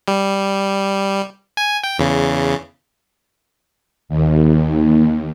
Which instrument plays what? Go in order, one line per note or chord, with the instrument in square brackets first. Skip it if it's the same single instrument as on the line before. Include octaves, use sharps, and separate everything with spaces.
[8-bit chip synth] G3
G#5
G5
E2 C#3
[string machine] D#2